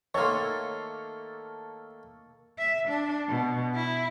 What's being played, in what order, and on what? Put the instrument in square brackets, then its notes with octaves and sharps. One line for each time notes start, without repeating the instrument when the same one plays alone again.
[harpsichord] D#3 A3 [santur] A#3 A4 [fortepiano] C#5 C6 [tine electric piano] C#6 F6
[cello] E5
D4
B2
E4